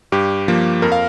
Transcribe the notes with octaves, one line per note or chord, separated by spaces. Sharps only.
G2 G4
F3 A#3
F2 A#4
F5